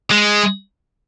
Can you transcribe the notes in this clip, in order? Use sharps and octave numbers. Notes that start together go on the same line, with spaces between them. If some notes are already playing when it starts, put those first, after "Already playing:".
G#3